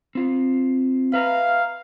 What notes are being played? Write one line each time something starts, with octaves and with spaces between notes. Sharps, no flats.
C4 F4
B4 E5 F5 A#5